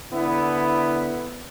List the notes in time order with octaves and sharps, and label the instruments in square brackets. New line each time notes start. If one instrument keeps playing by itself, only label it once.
[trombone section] D3 B3 E4